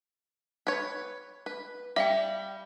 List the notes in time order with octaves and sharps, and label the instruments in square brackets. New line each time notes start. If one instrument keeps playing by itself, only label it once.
[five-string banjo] B4 C#5
B4
[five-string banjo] G3 [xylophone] E5 F5 G5